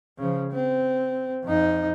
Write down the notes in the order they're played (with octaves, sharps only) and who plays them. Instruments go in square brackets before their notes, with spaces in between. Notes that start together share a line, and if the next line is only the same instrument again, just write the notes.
[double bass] C#3 F3
C4
F2 D#4